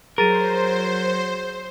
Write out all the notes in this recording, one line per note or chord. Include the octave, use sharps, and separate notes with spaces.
F#3 G#4 A#4 C5 A6 D#7